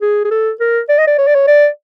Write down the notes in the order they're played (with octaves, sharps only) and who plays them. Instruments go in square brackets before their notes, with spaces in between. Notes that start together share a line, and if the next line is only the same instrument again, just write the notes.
[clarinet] G#4
G#4
A4
A#4
D5
D#5
D5
C#5
D5
C#5
D5